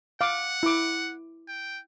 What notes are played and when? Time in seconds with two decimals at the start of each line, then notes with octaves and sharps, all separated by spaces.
0.21 F5 F#5 D6
0.63 E4 D6
1.48 G5